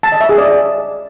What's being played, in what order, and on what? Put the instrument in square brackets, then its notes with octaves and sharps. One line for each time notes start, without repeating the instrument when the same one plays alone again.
[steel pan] A5
D#5
E5
G#4
D5